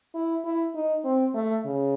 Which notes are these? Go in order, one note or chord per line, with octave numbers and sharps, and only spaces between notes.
E4
E4
D#4
C4
A3
C#3